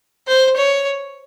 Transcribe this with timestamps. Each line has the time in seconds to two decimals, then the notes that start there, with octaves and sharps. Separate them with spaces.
0.28 C5
0.56 C#5